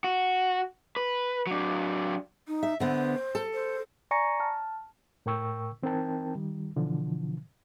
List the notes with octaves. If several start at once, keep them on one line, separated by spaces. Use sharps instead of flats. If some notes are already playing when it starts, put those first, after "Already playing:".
F#4
B4
F#3 D4
D#4
E5
D3 B3 C5
A4
C5
D5 G#5 A#5 C#6 A#6 C#7
A5 F6
A2 A#4 G5 C#6 E6
E3 C4 D#4 A#4 G5 A5
D#3 G3
B2 D3 E3 F3